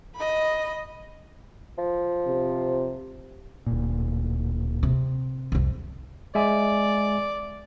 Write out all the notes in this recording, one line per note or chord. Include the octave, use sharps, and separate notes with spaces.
D#5 B5
F3
C3
D1 A#2
C3
C2 F2
G#3 D5 E5 G#5